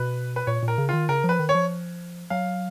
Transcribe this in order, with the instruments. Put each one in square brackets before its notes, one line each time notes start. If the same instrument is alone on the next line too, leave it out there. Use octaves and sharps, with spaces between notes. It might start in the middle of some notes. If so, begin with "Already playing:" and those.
Already playing: [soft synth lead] B2 [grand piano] B4
[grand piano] B4
[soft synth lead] A#2 [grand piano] C#5
[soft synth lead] A#2
[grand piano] A#4
[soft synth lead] C#3
[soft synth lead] D#3 [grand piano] F4
[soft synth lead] C#3 [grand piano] A#4
[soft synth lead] F3
[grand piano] B4
[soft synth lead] D#3
[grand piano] C#5
[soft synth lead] F3
[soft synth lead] F#3 [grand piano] F5